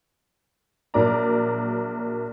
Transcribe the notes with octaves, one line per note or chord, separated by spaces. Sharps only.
A#1 F#3 A#4 D5 A#5